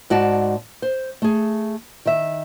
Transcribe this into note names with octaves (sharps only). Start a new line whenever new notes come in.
G#2 F#4 D5 A5
C5
A3 G#4
D#3 E5